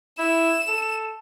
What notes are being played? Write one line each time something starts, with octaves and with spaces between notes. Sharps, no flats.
E4 E7
A4